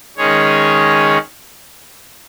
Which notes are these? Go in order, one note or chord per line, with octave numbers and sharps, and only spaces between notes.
D#3 G#3 C#4 G#4 C#5